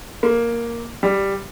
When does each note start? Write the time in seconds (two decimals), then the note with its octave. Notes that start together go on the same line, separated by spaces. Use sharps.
0.23 A#3
1.03 G3